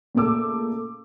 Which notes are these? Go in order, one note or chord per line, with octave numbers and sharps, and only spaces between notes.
A#2 C#3 A3 A4 D6 E6